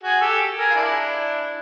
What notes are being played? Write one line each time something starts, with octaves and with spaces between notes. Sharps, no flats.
F#4 G#4
G4 A4
G#4 A#4
F4
D4 E4